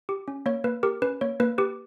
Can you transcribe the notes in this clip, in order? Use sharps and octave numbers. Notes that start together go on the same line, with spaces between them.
G4
C#4
A#3 C#5
A#3 B4
G4 A#4
C#4 B4
A#3 C#5
A#3 B4
G4 B4